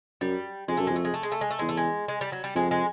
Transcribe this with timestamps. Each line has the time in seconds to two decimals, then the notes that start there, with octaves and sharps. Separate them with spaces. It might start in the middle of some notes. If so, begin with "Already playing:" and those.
0.21 F#2 G3
0.68 F2 G#3
0.77 F#2 A3
0.87 F2 G#3
0.96 A3
1.05 G#3
1.14 A3
1.23 G#3
1.32 A3
1.41 G#3
1.51 A3
1.59 E2 G#3
1.69 A3
1.77 G#3
2.08 G#3
2.21 G3
2.32 F#3
2.44 G3
2.55 F2 G#3
2.71 G#3